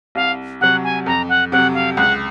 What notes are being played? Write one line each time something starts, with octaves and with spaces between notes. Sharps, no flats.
C2 F5
C3 F#3 F#5
G#5
F2 A#5
F#5
C3 F#3 F#5
F5
C#2 F#5